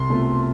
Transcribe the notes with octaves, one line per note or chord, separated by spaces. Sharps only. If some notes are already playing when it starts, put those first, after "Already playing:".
Already playing: C2 C6
B2 A3 C4 F4